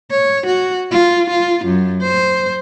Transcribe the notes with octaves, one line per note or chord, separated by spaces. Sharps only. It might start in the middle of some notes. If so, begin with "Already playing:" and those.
C#5
F#4
F4
F4
F#2
C5